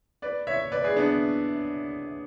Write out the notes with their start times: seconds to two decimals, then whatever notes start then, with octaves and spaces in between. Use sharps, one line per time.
0.22 B4 D5
0.47 C#5 E5
0.72 B4 D5
0.84 G#4 B4
0.96 B3 D4